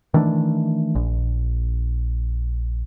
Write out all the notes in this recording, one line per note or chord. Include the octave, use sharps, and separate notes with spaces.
D#3 E3 A3 D4
A#1